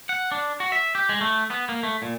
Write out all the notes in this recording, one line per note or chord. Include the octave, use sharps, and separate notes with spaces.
F#5
D4
F#4
E5
G4
G#3
A3
B3
A#3
A3
A#2